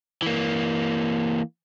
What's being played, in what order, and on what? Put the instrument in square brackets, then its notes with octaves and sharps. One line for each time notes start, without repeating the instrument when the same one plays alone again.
[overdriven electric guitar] E3 A#3